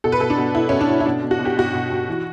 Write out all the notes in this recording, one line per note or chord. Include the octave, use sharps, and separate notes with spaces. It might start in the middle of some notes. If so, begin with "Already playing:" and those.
B2 A4
B4
B2 A4
D4
B2
B2 E4
B2 C#4
D4
B2
E4
B2 D4
B2
F#4
B2
G4
B2 F#4
B2
B2
E3